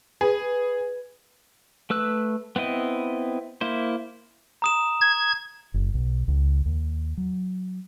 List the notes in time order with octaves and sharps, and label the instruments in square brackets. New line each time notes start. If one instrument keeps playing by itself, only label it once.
[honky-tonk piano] G#4 [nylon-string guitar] B4
[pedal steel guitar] A3 B4 E6 F#6
B3 C4 E4 D#5
A#3 E4 C5
[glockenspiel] A#5 D#6 E7
[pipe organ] G#6
[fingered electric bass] F#1
B1
C#2
D#2
F#3